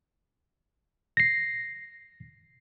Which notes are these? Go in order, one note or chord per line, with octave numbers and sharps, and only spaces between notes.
A#6 C7